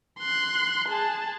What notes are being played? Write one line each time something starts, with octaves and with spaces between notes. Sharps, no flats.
C6 F#6
G#4 A5